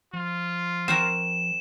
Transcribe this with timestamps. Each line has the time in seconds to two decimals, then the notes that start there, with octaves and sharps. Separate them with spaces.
0.13 F3 F4
0.88 C4 F#4 A#4 E7